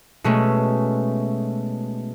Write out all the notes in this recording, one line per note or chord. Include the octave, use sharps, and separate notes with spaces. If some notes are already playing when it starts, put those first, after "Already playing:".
B2 G#3 A3 C#4